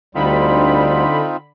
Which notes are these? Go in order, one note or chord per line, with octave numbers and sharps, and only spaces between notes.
D2 D3 G3 C4 D#4 F4 B5